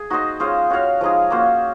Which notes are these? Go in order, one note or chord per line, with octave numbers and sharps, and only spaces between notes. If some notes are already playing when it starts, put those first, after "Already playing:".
Already playing: G#4
D#4 F#4 C5 D#5
G#3 C#4 F4 C5
C#4 F#4 C#5 F5
F3 G#3 D#4 G#4
A#3 C#4 F#4 C5